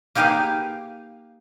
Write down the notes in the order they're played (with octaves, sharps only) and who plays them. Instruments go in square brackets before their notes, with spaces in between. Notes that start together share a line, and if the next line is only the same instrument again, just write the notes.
[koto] A#3 D#4 G4 G#4 B4 F5